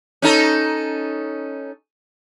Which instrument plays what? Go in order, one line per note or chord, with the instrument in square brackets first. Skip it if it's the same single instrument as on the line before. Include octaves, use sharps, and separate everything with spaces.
[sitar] C#4 D#4 A4